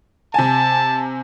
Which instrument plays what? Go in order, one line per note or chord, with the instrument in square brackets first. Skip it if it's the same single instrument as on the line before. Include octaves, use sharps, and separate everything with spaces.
[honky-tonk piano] C3 G#5 [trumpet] A5